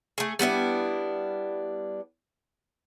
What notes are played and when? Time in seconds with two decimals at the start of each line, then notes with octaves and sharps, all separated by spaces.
0.18 A3 G#4
0.39 G3 B3 D4 E4